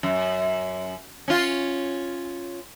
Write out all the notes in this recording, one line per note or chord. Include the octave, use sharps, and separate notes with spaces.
F#2
C#4 F4